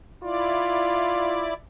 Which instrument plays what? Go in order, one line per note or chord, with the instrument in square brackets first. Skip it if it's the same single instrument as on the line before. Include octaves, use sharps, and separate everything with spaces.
[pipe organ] E4 D5 [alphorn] F4